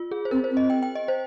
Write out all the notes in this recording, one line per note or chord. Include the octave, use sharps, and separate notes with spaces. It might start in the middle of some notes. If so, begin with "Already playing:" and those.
Already playing: F4
G#4
C5
C4 A#4
C5
C4
D#5
G5
G5
D#5
C5